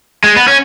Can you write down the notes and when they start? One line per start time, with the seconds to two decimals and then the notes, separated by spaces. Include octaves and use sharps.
0.24 G#3
0.36 B3
0.48 C#4